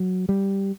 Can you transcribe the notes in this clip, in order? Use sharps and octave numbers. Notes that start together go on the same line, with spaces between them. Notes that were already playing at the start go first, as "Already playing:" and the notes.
Already playing: F#3
G3